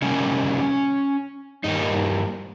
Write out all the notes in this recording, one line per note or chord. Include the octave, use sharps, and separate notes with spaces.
C3 G3 A#3 C#4
G2 G3 A#3 D#4